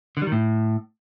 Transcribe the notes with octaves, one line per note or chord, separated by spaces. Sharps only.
D3
G3
D#3
A2